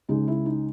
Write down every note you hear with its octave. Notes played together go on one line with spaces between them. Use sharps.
C#2 C#3 G#3 D#4
E4
D#4